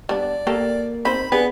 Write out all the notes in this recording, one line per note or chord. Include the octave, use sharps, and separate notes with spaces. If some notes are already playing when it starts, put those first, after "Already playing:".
G3 B3 D4 D5
A#3 G4 A4
C4 D#4 C5 B5
B3 D4 G4 G#4 B4